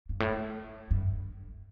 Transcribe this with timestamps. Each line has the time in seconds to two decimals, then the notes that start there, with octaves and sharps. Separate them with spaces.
0.09 G2
0.20 A2
0.91 G2